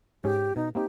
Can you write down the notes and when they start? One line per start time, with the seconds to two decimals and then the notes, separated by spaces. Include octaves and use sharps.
0.24 G#2 C#4 G4 G#4
0.56 B2 D#4
0.75 A#3 C4 D#4 G4